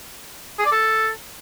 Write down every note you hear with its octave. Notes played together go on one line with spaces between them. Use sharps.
G#4
D5
A4